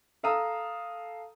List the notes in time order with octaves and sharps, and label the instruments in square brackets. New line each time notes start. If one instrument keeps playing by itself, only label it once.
[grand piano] A4 F5 A#5 D#6 E6